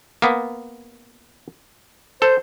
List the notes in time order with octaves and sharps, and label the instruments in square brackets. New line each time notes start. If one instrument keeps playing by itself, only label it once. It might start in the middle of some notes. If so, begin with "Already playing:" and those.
[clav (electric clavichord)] A#3 B3
[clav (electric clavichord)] A4 [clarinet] C5